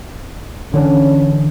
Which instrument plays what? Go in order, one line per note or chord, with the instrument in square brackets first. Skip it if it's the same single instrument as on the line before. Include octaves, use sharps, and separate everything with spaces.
[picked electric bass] D3 E3 D4 [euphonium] C#4